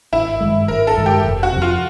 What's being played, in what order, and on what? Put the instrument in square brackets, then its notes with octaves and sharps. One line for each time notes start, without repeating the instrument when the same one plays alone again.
[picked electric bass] G#1 [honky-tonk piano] E4
[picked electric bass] G2 D#3 G#3
[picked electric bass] G#1 [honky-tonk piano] A#4
[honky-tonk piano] A4
[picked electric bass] G2 D#3 G#3
[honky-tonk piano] G4
[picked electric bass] F1
[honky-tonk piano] F#4
[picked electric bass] F2 C3
[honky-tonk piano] F4